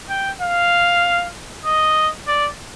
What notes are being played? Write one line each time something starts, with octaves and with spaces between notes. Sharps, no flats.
G5
F5
D#5
D5